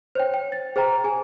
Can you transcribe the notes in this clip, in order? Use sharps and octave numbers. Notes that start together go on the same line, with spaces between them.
C5 C#5 G5
G5
A6
G#4 C5 G5 A#5
G#4 G#5